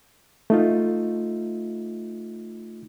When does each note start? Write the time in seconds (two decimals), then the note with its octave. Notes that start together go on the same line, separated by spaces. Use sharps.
0.50 A3 D#4 F4